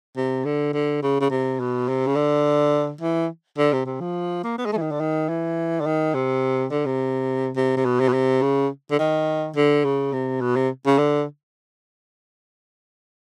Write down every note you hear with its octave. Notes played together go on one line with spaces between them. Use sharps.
C3
D3
D3
C#3
C#3
C3
B2
C3
C#3
D3
E3
D3
C3
C3
F3
A#3
B3
G#3
A3
E3
D#3
D3
D#3
E3
D3
D#3
C3
D3
C3
C3
C3
B2
C3
B2
C3
C#3
D3
D#3
D3
C#3
C3
B2
C3
C#3
D3